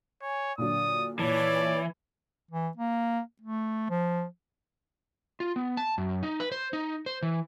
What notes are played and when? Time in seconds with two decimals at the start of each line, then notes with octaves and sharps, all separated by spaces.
0.22 C#5 G#5
0.58 A#2 D3 F#3 D5 D#6
1.19 A#2 E3 C#5 D5 A5
2.51 E3
2.77 A#3
3.41 A3
3.90 F3
5.40 F4
5.56 B3
5.77 A5
5.98 F#2
6.23 D#4
6.40 B4
6.52 C5
6.73 D#4
7.06 C5
7.23 E3